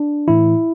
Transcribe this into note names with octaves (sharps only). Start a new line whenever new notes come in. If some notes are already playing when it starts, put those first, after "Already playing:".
Already playing: D4
A2 E3 E4